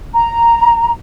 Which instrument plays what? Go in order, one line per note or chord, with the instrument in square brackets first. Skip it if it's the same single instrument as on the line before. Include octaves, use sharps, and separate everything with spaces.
[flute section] A#5